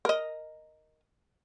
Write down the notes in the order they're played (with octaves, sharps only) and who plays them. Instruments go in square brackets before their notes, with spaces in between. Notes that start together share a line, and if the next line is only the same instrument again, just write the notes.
[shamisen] A#4 D#5